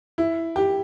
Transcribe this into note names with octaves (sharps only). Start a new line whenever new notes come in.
E4
G4